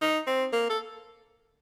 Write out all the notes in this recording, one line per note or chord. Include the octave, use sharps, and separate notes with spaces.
D#4
C4
A#3
A4